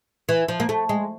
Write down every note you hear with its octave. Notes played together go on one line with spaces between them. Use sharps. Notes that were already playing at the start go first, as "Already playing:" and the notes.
E3
F3
A#3
A3
G#3